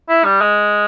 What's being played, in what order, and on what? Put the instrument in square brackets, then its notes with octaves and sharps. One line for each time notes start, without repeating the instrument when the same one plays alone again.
[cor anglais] E4
G3
G#3